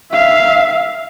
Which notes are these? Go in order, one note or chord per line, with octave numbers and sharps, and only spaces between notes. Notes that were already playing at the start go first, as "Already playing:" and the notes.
E5 F5